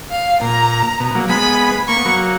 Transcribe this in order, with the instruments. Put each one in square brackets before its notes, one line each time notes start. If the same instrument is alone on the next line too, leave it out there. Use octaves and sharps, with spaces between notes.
[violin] F5
[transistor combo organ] A#2 [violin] A#5
[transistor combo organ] B2
F#3 A#3
[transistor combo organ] G#3 B3 [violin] B5
[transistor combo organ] A#3 [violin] C#6
[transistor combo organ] B3
F#3 A#3